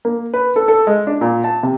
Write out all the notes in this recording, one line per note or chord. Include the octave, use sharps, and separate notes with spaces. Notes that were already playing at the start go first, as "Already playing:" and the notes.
A#3
B4
A4
A4
G#3
D4
A#2
A5
C3